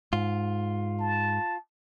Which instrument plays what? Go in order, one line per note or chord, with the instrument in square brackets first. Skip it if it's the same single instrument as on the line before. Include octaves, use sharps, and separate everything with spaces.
[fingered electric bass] G#2 [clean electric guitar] F4
[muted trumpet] A5